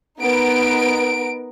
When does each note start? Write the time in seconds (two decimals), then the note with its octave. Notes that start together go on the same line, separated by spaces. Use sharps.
0.21 B3 D#4 A#4 D7